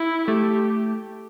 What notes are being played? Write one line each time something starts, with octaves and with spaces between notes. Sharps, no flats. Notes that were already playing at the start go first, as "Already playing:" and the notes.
Already playing: E4
A3 G4